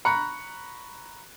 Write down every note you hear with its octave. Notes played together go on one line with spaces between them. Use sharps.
A#5 B5 C#6 F#6 C#7